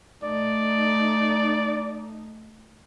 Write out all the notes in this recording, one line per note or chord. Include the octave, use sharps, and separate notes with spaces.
A3 D#4 D5